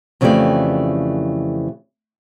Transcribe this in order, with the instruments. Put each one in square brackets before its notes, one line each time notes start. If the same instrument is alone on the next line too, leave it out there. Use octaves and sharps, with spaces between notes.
[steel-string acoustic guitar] F2 C#3 E3 A3 G4 D5